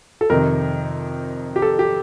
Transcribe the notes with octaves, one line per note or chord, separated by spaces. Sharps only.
A4
F2 C3 D#3 A#4
G4
A4
G4